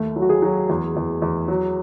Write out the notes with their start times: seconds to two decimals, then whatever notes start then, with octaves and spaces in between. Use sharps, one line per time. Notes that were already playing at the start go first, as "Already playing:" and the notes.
Already playing: D#2 A3
0.16 F#3
0.22 F#4
0.30 G#4
0.42 F#3
0.69 E2
0.96 E2
1.22 E2
1.48 F#3